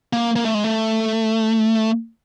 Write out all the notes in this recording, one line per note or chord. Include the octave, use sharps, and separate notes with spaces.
A#3
A#3
A3
G#3
A3